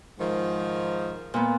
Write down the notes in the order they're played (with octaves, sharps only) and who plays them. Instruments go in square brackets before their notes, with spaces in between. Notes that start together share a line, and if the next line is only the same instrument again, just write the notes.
[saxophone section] G#2 D#3 F3
[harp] A#2 B3